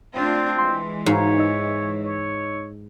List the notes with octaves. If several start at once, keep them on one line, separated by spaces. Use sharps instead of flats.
A3 C4 D4 F4
E3 G#3 C6
G#2 F#4 C#5 F5
D#4 D#5 E6
C#5